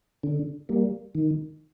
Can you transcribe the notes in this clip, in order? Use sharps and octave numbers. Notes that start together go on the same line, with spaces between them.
D3
G3 A#3
D#3